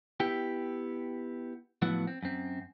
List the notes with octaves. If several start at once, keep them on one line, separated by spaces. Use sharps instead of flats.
B3 E4 G4 G5
A2 F3 F#3 B3 E4 F#5
C4
F#2 C4